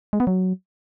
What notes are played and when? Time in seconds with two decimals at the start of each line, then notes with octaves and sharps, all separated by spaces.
0.13 G#3
0.20 B3
0.27 F#3